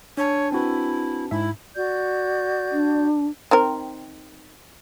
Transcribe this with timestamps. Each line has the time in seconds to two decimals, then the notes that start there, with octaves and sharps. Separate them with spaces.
0.17 D4 C#5 A5
0.52 C4 E4 F#4 B4
1.31 G#2 E4 E5
1.75 F#4 D5 G6
2.72 D4
3.51 D#3 C4 A#4